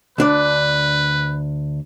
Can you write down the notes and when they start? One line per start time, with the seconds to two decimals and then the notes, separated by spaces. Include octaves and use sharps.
0.18 D2 D4 B4 D5